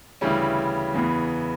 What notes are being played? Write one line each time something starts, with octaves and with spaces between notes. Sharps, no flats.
D2 C#3 E3 G3 C#4
E2 C#3 E3 B3